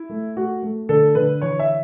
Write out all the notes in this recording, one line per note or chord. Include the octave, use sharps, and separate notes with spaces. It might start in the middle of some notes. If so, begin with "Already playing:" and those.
Already playing: E4
A3
A3 F#4
A3
D3 A4
D3 B4
E3 C#5
E5